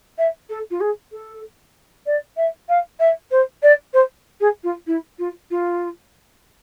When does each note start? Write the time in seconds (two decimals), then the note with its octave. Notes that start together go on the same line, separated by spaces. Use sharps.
0.18 E5
0.49 A4
0.70 F4
0.80 G#4
1.12 A4
2.06 D5
2.36 E5
2.68 F5
2.99 E5
3.31 C5
3.62 D5
3.93 C5
4.40 G#4
4.63 F4
4.86 E4
5.18 F4
5.50 F4